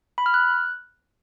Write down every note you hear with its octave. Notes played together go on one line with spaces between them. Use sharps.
B5
F6
F#6